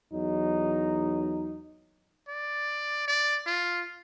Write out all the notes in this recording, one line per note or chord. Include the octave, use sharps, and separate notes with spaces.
E2 F#3 D#4
D5
D5
F4